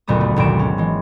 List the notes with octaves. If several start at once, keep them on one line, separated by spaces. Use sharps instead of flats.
F#1 D2 A#2 B3 D#6
A3
G#1 D2 B2 D7 E7
C#4
E3 G#3